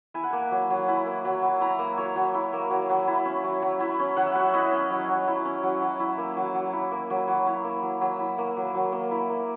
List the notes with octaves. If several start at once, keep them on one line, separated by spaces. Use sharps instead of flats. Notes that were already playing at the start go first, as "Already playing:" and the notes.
E4 G#5
F#5
A#3 G#5
F#3
F#3
E4
A#3
F#3
F#3
E4 A#5
A#3
F#3 C#5
F#3
E4
A#3
F#3
F#3
E4
C#4
F#3
F#3
E4
C#4
F#3 F#5
E5
F#3 F#5
E4 D#5
C#4
F#3
F#3
E4
C#4
F#3
F#3
E4
A#3
F#3
F#3
E4
A#3
F#3
F#3
E4 C#5
A#3
F#3
F#3
E4
A#3
F#3
F#3
A#3
E4
A#3